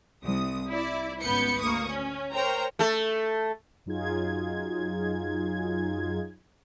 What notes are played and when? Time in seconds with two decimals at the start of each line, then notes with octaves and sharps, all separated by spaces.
0.23 C2 D#6
0.72 E4 D5
1.21 G#1 C#2 B3 B4 G6 C#7
1.60 D2 A#3 C#6 D#6
1.89 C#4
2.33 A#4 C5 C#5 G5 A#5
2.79 A3 A4
3.86 F#2 F#3 D#4 F4 G#4 G#6